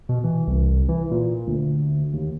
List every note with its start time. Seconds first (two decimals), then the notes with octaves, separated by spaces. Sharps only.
0.09 B2
0.24 E3
0.48 C2
0.89 E3
1.11 A#2
1.47 D2
2.14 D#2